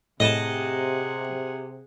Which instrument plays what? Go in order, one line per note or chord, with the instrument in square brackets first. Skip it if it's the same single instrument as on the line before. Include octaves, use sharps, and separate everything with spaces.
[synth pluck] A2 [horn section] C3 [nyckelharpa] G#4 F#5 [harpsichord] D#5 A5